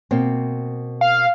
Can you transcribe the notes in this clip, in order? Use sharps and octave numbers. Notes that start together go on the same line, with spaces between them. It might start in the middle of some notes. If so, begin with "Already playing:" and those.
B2 A#3 C4
F5